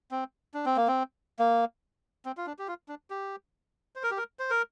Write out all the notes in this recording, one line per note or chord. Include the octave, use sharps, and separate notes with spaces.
C4
D4
C4
A#3
C4
A#3
C4
F4
D4
G4
F4
D4
G4
C5
A#4
G4
A#4
C5
A#4